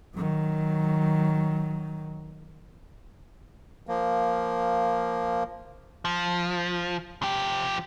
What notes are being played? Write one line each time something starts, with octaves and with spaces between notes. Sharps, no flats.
D#3 F#3
F3 A#3
F3
F3 G4